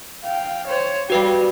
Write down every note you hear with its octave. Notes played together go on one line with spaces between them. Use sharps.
F5 G5
C5 C#5
G3 F#4 G4 B4 F5